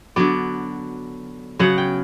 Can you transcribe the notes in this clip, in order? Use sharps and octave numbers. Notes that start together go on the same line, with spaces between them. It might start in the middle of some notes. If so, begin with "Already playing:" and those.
D3 F#3 B3 D5
C#3 F#3 B3 F#5
G5